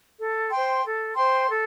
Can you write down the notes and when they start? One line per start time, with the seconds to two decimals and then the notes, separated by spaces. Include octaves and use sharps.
0.18 A4
0.50 C5 G5 C6
0.83 A4
1.15 C5 G5 C6
1.48 A4